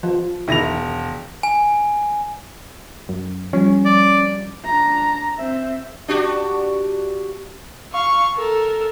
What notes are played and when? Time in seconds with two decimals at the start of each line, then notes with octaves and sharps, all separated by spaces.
0.03 F3
0.48 E1 D#3 E4 A#6 F7
1.43 G#5
3.09 F#2
3.53 F3 G3 C#4
3.85 D5
4.65 D4 A#5
5.37 C4 E5
6.08 D4 F#4 G4
7.93 F5 C#6
8.36 A4 A#4